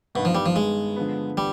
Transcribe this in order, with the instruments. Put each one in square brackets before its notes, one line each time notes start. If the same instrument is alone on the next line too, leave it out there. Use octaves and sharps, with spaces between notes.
[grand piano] G2 D#3 B3 [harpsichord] B2
[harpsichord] F3
G3
F3
G#3
[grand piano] D3 F3 B3
[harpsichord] G3